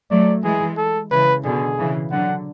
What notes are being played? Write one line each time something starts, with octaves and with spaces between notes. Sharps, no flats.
F#3 A3 D5
E3 G#3 G#4
A4
C#3 E3 B4
B2 D3 G#4
C#3 E3
D3 F#3 F#5